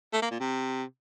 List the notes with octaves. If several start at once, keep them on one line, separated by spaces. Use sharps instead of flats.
A3
A#3
A#2
C3